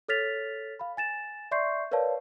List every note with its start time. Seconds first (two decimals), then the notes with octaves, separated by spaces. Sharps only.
0.09 A4 C#5 F6 A6 B6 F7
0.80 F5 B5
0.97 G#5 A6 E7
1.51 D5 E5 C6 C#6 G6 C7
1.91 A#4 B4 C#5 D5 F5 A5